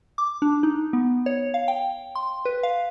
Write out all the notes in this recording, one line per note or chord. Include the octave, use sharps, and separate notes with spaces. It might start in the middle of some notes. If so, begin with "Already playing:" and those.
D6
D4
D#4
B3
C#5
F5
G5
C6
B4
F5